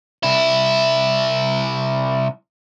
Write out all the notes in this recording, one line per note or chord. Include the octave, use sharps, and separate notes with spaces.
C2 E4